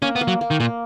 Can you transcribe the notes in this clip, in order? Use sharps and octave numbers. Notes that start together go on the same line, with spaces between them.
A#3 C#4
B3
A#3
F#3
A#3
D#3
A#2 A#3